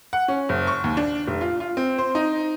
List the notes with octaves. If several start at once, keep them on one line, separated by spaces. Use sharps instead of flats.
F#5
C#4
F#1
C#6
D#2
D4
F1
F4
F4
C4
C5
D#4